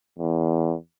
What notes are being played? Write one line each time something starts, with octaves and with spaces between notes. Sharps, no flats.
E2